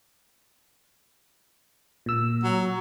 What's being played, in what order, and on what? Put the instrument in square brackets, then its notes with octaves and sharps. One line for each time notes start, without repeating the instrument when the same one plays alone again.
[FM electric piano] A#2 E6
[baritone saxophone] F#3